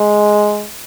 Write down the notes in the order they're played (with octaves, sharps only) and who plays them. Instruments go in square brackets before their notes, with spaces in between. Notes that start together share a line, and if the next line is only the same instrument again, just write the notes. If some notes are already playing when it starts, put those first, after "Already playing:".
Already playing: [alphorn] G#3